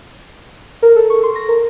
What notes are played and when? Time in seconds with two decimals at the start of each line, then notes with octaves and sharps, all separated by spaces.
0.82 A#4
0.96 A4
1.10 C#6
1.23 C6
1.35 A#6
1.48 A#4